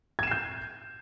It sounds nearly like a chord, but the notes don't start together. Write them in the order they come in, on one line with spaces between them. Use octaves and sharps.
G#6 E7 C7 G6